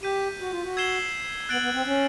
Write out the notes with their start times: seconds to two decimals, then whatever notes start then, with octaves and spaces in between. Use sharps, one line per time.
0.03 G4 G6 B6 D#7
0.40 F#4
0.51 F4
0.63 F#4
0.77 E6 G#6 C7 E7 G7
1.49 B3 F#6 A6 D7 F#7
1.61 B3
1.74 C4
1.86 C#4